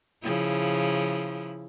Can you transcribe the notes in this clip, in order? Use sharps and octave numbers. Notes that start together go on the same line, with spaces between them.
C#3 F3 E4